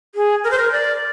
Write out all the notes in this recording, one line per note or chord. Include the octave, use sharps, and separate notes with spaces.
G#4
A#4
C5
A#4
D5